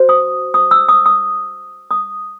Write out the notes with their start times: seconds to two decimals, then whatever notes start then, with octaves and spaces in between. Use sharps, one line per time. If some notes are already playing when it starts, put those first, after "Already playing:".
Already playing: F#4 C5
0.09 D#6
0.54 D#6
0.71 E6
0.89 D#6
1.06 D#6
1.91 D#6